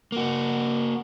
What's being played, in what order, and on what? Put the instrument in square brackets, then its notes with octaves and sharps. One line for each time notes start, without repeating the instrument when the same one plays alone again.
[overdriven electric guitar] A#3 F#4